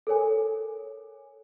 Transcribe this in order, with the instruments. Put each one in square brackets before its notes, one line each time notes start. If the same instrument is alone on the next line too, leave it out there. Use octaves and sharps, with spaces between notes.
[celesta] A4 A#4 C#5 G#5